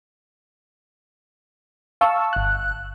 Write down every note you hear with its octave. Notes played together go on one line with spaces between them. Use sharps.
F5 A5 C#6 E6
G1 F#6